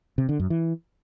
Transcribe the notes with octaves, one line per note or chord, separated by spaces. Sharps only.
C3
D3
F#2
E3